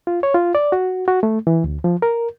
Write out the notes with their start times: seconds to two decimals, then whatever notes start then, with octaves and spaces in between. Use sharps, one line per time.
0.07 F4
0.23 C#5
0.34 F4
0.55 D5
0.72 F#4
1.08 F#4
1.23 A3
1.47 E3
1.64 D2
1.84 F3
2.02 A#4